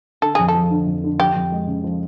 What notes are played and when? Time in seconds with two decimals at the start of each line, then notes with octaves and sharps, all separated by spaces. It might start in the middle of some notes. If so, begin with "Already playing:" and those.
0.22 D3 A4
0.35 F2 G#4
0.48 A4
0.54 F3
0.71 D3
0.87 F2
1.04 D3
1.19 F3 G4
1.36 F2
1.52 G#3
1.67 C#3
1.84 F3